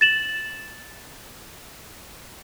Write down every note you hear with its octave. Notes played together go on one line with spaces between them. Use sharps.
A6 E7 F#7